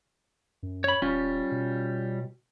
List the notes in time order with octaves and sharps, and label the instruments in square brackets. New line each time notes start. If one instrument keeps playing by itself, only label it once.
[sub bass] F#2
[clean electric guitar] C#5 B5
[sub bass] D#1 [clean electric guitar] G3 C#4 F4
[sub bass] B2